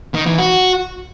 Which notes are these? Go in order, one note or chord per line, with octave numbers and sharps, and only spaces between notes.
D#3
E3
F#4